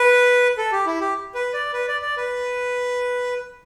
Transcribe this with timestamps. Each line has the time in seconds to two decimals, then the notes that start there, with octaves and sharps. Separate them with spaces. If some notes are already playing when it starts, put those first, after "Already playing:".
Already playing: B4
0.57 A4
0.72 G4
0.86 E4
1.00 G4
1.35 B4
1.54 D5
1.73 B4
1.88 D5
2.02 D5
2.17 B4